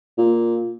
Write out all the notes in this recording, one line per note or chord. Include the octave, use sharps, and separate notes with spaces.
A#2